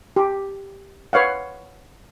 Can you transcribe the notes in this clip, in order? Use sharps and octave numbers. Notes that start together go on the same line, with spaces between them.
G4
B4 C#5 F5 F#5